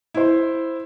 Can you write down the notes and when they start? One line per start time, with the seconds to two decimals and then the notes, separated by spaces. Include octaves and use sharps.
0.14 E4 C5